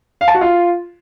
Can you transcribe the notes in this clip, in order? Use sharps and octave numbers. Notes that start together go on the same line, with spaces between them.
F5
A5
F#4
F4